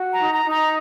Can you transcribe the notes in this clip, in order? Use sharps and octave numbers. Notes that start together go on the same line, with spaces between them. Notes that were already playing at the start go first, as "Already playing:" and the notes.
Already playing: F#4
A#5
D#4
A#5
D#4
A#5